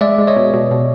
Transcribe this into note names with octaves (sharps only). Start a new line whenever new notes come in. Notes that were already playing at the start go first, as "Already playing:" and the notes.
G#3 D5 E5
G#3
C#5 D#5
B2
B2
B2